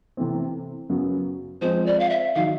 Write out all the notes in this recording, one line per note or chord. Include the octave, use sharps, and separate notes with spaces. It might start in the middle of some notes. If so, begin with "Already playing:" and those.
C3 E3 A3 C4
F#2 C#3 F#3 B3
F3 G#3 C4 C5
D5
F5
E5
D#3 F#3 F5